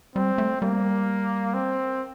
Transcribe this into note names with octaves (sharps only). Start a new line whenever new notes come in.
G3 C4
A3
G3 A#3
C4